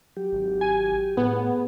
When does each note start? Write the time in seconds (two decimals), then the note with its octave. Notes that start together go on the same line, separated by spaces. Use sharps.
0.17 F#3 G4
0.32 G#1
0.61 G#5
1.17 A2 B3 G#4